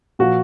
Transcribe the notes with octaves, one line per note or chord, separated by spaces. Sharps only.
A#2 F3 F#4